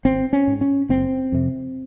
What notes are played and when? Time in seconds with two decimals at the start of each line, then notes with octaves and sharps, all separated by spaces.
0.05 G#1 C4
0.33 C#4
0.47 G#2
0.61 C#4
0.89 F#1 C4
1.32 F2 C3